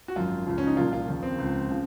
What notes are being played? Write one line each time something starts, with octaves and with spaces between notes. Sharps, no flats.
F#4
G#1 F#2 F3 F4
C#2 C#3 F3
C#4
D#4
C2 A#2 F3 F4
F4
D#2 C#3 F3
C4
C#2 C#3 F3
C#3 F3